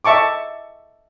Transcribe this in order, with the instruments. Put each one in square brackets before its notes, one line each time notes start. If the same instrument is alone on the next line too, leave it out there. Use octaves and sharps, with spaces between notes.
[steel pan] D#5 E5 A5 C#6 D6